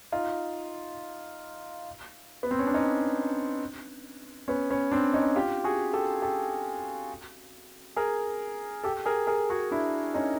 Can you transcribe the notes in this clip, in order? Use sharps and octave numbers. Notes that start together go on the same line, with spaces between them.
D#4 F4
B3
C4
C#4
D4
C#4 D#4
B3 C#4
B3 C#4
C4 D4
C#4 D#4
F4 G4
F#4 G#4
G4 A4
G4 A4
G#4 A#4
G4 A4
G#4 A#4
G#4 A#4
F#4 G#4
D4 E4
C#4 D#4